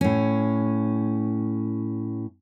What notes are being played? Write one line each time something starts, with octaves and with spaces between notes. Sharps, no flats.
A2 C#4